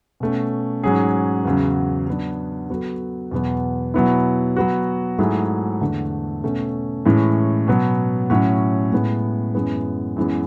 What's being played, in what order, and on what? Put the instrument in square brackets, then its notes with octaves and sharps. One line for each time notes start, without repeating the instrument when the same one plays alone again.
[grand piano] B2 A3 C#4
G#2 F#3 C#4 G#4
E2 C#3 F#3
F#3 B3 D4
F#3 B3 F#4 A4
E2 B2 F#3 B3
B2 F#3 B3 E4
F#3 B3 F#4
G#2 F#3 A3 E4 G#4
E2 D3 A3
B2 A3 C#4
A2 E3 G#3 C#4
B2 F#3 B3
A2 F#3 C#4 F#4
A2 G#3 B3
F#2 E3 G#3 B3
F#2 E3 G#3 B3